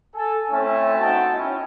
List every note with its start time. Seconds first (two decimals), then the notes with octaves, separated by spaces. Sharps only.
0.15 A4 G#5
0.52 A3 C4 C#4 E4 E5 A5
0.99 B3 D#4 F#4 G5 A5
1.34 C#4 E4 D#5